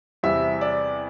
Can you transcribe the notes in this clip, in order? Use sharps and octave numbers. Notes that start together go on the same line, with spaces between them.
E2 C3 G3 E5
D5